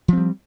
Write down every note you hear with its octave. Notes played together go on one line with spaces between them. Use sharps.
F3 G3 C4